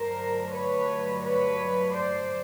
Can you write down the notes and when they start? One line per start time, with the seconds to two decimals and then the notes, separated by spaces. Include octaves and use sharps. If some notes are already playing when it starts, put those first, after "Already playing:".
Already playing: G2 D3 F#3 A3 D4 A#4 C5
0.53 B4 C#5
1.24 B4 C#5
1.94 C5 D5